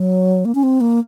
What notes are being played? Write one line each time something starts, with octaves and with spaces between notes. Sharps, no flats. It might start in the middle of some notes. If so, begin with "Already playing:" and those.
Already playing: F#3
A#3
C#4
C4
A#3